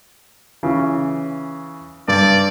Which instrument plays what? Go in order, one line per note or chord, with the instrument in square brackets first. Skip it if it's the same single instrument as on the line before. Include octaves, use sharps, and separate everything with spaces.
[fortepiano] C#3 E3
[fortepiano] G2 [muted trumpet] D5